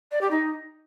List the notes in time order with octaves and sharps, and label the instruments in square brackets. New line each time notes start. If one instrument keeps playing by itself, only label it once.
[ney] D5
G4
D#4